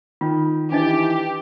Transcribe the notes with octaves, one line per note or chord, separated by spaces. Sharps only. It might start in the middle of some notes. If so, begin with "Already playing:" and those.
D#3 F4
E3 D4 D#4 G4 D#5